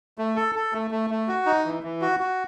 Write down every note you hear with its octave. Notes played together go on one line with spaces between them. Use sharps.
A3
A4
A4
A3
A3
A3
F#4
D#4
E3
E3
F#4
F#4